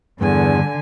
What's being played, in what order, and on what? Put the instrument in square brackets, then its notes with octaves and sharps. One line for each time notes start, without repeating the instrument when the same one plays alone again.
[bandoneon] E2 [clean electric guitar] G2 [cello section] D3 [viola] G#5